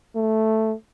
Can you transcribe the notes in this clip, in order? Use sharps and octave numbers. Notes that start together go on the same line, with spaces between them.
A3